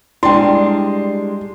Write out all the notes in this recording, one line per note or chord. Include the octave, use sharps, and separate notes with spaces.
G3 G#3 D4 E4 G5 C6